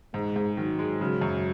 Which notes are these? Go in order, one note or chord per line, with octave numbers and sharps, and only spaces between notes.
G#2 G#3
G#2
D#3 F#3
G#3
C#3 F#3
F#2